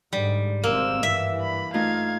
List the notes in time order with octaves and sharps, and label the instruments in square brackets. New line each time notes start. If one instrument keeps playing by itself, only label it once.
[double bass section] G#2 D3 [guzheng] G3
[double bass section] G#1 C3 C4 [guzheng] A#3 [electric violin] E6
[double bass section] G2 E3 [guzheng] E5
[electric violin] B5
[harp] A3 D#4 F4 [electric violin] F5 G#6